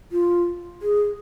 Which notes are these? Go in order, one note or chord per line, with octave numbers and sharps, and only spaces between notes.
F4
G#4